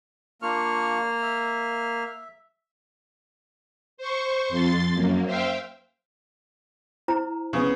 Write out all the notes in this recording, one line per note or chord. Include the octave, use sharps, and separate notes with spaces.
A#3 D4 F4 C#6 F6
E5
C5 C#6
F2 C6 A6
F#2 A#3
C5 E5 F5 G5
E4 C5 A#5
C#3 B3